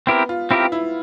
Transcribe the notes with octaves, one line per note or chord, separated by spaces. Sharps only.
B3 C4 E4 G4 A#4
F4
C4 E4 F4 G4 A#4
E4